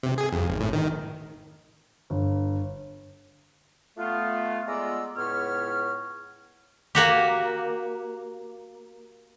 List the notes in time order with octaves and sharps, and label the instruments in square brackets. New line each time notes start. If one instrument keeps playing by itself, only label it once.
[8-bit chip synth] C3
G#4
F2
G#1
A2
D#3
[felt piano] G1
[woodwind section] A3 B3 F4
G#3 B3 F4 D5 A#5 E6
C#2 A2 B3 C#5 F6
[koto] A#3 F#4 G4